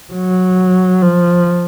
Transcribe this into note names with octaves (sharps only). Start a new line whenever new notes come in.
F#3
F3